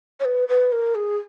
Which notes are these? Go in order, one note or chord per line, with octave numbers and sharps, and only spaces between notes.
C#5
B4
B4
A#4
G#4